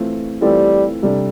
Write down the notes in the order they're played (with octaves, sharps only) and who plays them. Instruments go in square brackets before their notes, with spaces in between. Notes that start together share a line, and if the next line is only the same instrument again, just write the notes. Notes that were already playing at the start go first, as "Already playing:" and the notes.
Already playing: [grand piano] E3 A3 C4 F4 A4
[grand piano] E3 A3 C4 F4 A4 [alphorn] G3
[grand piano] C3 G3 D4 A4